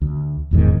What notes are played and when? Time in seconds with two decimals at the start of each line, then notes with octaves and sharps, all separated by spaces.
0.02 D2
0.51 D#1 E2 G#2 D#3